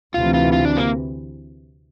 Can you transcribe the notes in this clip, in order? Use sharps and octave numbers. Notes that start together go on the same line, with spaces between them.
D2 C3 E3 F4
F4
F4
D4
A#3